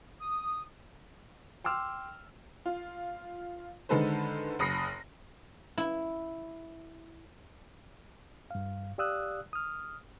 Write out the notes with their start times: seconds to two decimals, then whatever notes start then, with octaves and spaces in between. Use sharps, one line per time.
0.20 D#6
1.64 G5 C6 D6 E6 F6
2.66 F4
3.89 D3 D#3 G#3 A4 B4 C5
4.59 F#1 B5 D#6 A#6 C7 C#7
5.78 E4
8.51 G2 F5
8.98 G4 D5 F5 D#6 E6 F#6
9.53 D#6 F6